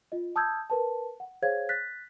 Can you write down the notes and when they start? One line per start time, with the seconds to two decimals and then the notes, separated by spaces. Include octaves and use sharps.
0.12 F4 D#5
0.36 A5 D#6 E6 G6 G#6
0.70 A#4 B4 A5
1.20 F#5
1.42 G#4 C5 C#5 F5 G#6
1.69 F#6 A6 B6